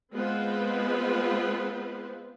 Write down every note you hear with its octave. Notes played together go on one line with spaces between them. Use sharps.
G#3 B3 C4 F4 B4 C5